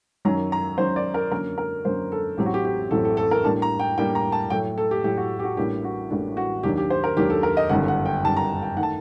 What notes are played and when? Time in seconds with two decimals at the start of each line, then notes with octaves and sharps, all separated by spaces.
0.25 F#2 D#3 F#3 A#5
0.52 A#5
0.78 F#2 D#3 F#3 C5
0.96 D5
1.14 A#4
1.31 F#2 D3 F#3 A#3 A#4
1.58 A#4
1.85 F#2 D3 F#3 A#3 C5
2.12 A4
2.37 A1 A2 F#3 C4 G4
2.46 F#4
2.54 G4
2.65 G4
2.91 A1 A2 F#3 C4 A4
3.05 A4
3.17 A4
3.31 A#4
3.44 A2 G3 A#3 D4 A5
3.62 A#5
3.80 G5
3.97 A2 G3 A#3 D4 G5
4.15 A#5
4.32 A5
4.50 A2 F#3 A3 G5
4.78 A4
4.91 G4
5.04 A2 F#3 A3 G4
5.17 F#4
5.39 G4
5.44 F#4
5.57 A1 A2 G3 A#3 D4 G4
5.84 F#4
6.10 A1 A2 G3 A#3 D4
6.37 F#4
6.63 D#2 D#3 F#3 A#3 D4 G4
6.77 G4
6.90 C5
7.04 A#4
7.17 D#2 D#3 F#3 A#3 D4 G4
7.30 A4
7.43 A#4
7.57 D#5
7.69 G1 F#2 D#3 G3 F#5
7.88 F#5
8.05 G5
8.24 G1 F#2 D#3 G3 A5
8.37 A#5
8.63 G5
8.76 D#3 A3 F#5
8.83 A5